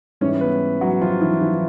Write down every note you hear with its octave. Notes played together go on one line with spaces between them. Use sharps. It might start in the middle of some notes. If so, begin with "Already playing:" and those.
G#2 E3 G3 C#4 C#5
B3 B4
F#3 F#4
F3 F4
E3 E4
E3 E4